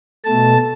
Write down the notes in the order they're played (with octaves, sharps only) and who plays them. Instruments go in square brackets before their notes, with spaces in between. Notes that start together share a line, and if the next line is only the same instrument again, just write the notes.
[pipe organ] B2 A3 A5